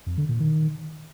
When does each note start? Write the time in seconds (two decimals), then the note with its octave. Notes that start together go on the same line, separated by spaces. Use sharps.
0.07 F2
0.18 D3
0.29 A#2
0.40 D#3